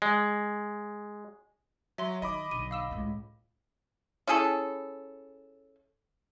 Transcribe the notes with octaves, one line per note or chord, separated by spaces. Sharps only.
G#3
F#3 E5 C6
D#3 D#5 B5 D6
B1 D3 D#7
F5 E6 E7
C#2 A2
C#4 E4 G#4 A4